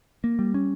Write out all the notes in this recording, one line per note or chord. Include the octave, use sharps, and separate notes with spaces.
A#3
G3
C#4